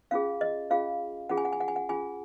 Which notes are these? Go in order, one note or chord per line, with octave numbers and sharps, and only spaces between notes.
C#4 F4 G#4 F5
D#5
C#4 F4 G#4 F5
C#4 F4 G#4 F#5
G#5
F#5
G#5
F#5
G#5
F#5
C#4 F4 G#4 G#5